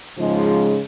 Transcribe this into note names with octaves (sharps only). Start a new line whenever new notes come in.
G#2 C#3 F3 G#3